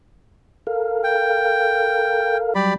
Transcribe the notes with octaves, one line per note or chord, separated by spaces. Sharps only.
A4 A#4 F5
G5
F#3 G3 G4 D5 B5